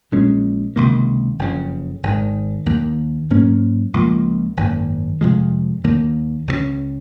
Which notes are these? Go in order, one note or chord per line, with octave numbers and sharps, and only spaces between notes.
A#1 A#2 G#3 C#4
C#2 C3 D#3 A#3
F#1 F2 C#3
G#1 G#2 D#3
D#2 D#3 A#3
G#2 F#3 A#3 C#4
C#2 C#3 F3 A#3
G#1 F#2 D#3 A#3
F2 C3 F3 G#3
D#2 D#3 A#3
C#2 C#3 G#3 C#4